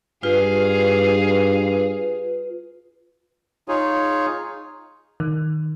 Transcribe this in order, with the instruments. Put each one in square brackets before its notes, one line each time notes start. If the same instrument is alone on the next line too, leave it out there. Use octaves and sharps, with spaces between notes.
[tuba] G2 [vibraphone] F4 B4 [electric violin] G#4 F5
[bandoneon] D#4 F4 G#4 C#5
[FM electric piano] D#3